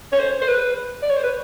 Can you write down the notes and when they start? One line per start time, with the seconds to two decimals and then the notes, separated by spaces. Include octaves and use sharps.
0.12 C#5
0.19 C5
0.41 C5
0.48 B4
1.02 D5
1.10 C#5
1.17 C5
1.23 B4